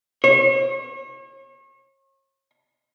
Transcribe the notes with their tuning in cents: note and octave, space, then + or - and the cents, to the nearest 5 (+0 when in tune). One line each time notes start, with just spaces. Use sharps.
C#5 -40